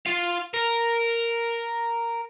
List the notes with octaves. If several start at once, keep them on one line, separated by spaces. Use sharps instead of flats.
F4 F5
A#4